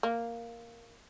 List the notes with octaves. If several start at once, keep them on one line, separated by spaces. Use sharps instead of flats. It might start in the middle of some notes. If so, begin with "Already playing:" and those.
A#3